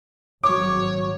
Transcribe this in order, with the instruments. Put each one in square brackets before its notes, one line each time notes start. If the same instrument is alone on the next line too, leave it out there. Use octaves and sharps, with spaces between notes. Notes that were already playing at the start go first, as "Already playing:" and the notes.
[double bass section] G#1 F#3 [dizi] C#5 [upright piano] D6